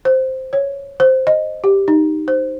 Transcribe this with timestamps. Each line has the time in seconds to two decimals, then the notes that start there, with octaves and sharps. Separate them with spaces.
0.05 C5
0.53 C#5
1.00 C5
1.27 D#5
1.64 G4
1.88 D#4
2.28 C5